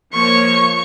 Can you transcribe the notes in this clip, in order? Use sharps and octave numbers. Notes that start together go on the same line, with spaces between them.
F3 A#3 C#5 C#6